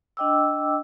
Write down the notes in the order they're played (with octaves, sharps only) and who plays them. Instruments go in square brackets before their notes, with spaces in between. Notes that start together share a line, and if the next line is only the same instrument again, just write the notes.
[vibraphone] D4 D#5 G5 D6 E6